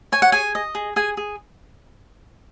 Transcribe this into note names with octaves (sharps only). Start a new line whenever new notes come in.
C#5 G#5
F#5
G#4 G#5
D#5
G#4
G#4 G#5
G#4